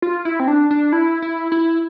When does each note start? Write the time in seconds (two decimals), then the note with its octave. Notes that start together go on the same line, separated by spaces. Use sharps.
0.02 F4
0.25 E4
0.40 C4
0.48 D4
0.71 D4
0.92 E4
1.22 E4
1.52 E4